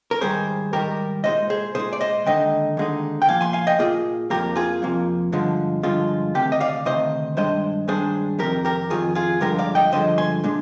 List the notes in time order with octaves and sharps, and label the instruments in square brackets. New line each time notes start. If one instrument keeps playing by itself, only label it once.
[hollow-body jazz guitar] A#4
G#2 D#3 G3 G#4 C5
G#2 D#3 G3 G4 A#4
A#2 G#3 D#4 C5 D#5
G#4 C5
A#2 G#3 D#4 G#4 C5
D5
C5 D#5
D#2 D3 G#3 D#4 D#5 G5
D#2 D3 G#3 D#4
G5
A#2 F3 A#3 F5 G#5
G#5 C6
F5 G#5
D#5 G5
A#2 F3 A#3 F4 G#4
F2 C3 F3 A#3 G4 A#4
F4 G#4
F2 C3 F3 A#3
G2 D3 F3 G#3
G2 D3 F3 G#3 F4
D2 C3 D#3 G4
D#5
D5 F5
D2 C3 D#3 C5 D#5
G2 D#3 G#3 D4 C5 D#5
G2 D#3 G#3 D4 G#4 C5
F2 C3 D#3 G4 A#4
G4 A#4
F2 C3 D#3 F4 G#4
F4 G#4
G2 D3 F3 G#3 G4 A#4
D5 F5
D#5 G5
G2 D3 F3 G#3 C5 D#5
G#5 C6
A#2 G#3 D4